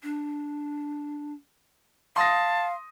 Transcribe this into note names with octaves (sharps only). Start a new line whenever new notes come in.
D4
F5 A5 C6 D#6 A#6